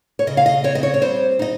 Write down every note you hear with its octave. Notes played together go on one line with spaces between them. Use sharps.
C#5
C#3 D#5
F5
D#5
C4 C#5
D#5
C#5
C#5
G3 C5
D#4 D#5